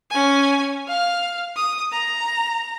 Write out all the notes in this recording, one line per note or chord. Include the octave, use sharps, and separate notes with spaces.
C#4 G#5
F5 F6
D#6
A#5